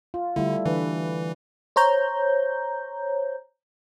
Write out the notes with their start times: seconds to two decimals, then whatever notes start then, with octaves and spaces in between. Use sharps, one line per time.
0.14 F4
0.36 D3 G3 A3 E4
0.66 D3 E3 B4
1.76 C5 C#5 A#5 G6